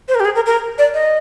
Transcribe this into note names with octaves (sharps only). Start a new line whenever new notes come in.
C5
A#4
G4
G#4
A#4
A#4
D5
D#5